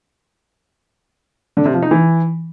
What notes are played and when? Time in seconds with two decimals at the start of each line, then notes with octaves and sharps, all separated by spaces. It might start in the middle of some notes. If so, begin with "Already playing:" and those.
1.57 D3
1.65 C3
1.74 F3
1.82 D#4
1.91 E3